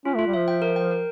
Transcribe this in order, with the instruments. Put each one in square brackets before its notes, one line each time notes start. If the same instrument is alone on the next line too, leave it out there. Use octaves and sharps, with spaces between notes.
[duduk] C#4 [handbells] F4
[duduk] A3
[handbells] F4
[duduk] G3
[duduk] F3 [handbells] E5
[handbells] G5
A#4
G5
A#4